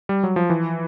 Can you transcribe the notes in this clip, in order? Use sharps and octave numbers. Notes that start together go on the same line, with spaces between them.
G3
F#3
F3
E3